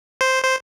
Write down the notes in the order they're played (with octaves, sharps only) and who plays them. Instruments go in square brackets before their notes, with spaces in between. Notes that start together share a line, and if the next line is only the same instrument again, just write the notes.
[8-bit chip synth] C5
C5